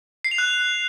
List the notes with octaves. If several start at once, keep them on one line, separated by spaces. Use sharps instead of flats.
C7
F7
F#6